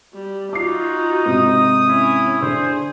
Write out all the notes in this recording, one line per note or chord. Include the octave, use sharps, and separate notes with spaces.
G3
D#4 F4 F#4 D6 C7
G#2 C3 D#6
C#4 E4
D3 G#4 C5